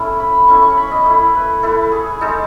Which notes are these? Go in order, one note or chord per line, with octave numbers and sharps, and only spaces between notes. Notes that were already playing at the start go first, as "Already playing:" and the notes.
Already playing: A3 C#4 E4
B5
A3 C#4 E4 C#6
C#6
B5
D#5
A3 E4
B4
A3 E4 A4
G#4
G#3 D#4 A4